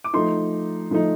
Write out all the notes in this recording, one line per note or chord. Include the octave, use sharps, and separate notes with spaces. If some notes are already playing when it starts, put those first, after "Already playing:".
D6
F3 A3 D#4 C6
F3 A3 D#4